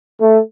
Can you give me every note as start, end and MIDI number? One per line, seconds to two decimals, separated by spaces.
0.20 0.38 57